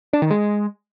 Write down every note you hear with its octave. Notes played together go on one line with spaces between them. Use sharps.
D4
D#3
G#3